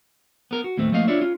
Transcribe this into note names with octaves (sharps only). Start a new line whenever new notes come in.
B3 A#4
F#4
D#2 A2 A3 C4
F3 A3 A#3 D#5 F5
D4 E4 F4 C#5 D5 E5
C#4 F4